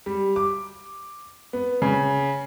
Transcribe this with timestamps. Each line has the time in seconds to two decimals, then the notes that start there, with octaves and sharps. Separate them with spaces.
0.06 G3
0.36 D6
1.53 B3
1.82 C#3